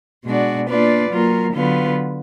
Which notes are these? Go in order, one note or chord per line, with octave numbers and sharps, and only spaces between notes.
B2 G#3 D4 F#4 D5
A#3 D4 F4 B4 D5
F#3 A#3 F4 A#4
D3 F#3 B3 F4 B4